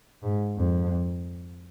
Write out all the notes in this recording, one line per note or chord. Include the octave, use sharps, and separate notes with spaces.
G#2
F2